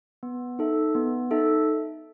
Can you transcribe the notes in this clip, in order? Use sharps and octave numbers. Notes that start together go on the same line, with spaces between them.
B3
D#4 A4 E5
B3
D#4 A4 E5